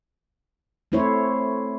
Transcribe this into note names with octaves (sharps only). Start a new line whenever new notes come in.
A3 C4 E4 C5 C#5